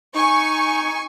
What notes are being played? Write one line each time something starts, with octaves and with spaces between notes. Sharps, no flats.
D#4 G#5 C#6